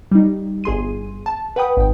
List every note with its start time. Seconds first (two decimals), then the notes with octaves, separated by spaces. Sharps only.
0.11 G3 D#4
0.64 G1 G#4 C6 D#7
1.26 A5
1.56 B4 F#5 G5 B5 D#6
1.77 G#1 G5